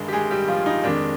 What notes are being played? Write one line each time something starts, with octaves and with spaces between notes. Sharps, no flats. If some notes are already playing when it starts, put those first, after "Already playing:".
Already playing: G1 G2 D#3 G#3
G4
G#3 G#4
G3 G4
F3 F4
D#4
F2 D#3 G#3 D4